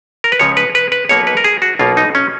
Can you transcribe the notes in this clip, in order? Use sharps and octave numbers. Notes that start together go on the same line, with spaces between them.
A#4
B4
C#2 C#3 F3 C#5
B4
B4
B4
B1 B2 A#3 C#5
B4
A#4
G#4
F#4
B1 B2 A#3 F4
D#4
C#4